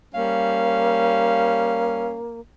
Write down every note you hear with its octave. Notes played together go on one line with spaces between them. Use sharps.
G3 A#3 C#4 F5